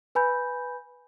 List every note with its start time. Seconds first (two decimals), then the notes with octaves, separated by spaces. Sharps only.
0.15 B4 G#5 B5 G6